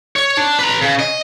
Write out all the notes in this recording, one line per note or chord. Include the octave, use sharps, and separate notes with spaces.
C#5
D4
B4 A#5
C#3
D#5